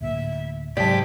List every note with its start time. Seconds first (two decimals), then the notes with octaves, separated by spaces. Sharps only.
0.01 D2 A2 A#3 E5
0.77 G#2 C3 F#3 G4 D5 F5 A5 B6